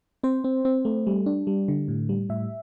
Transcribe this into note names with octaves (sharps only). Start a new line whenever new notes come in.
C4 C5
C4
C4
A3
G3
D4
G3
D3
A2
G3
A2 E5